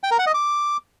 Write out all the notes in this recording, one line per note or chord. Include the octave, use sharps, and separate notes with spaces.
G5
A#4
F#5
D#5
D6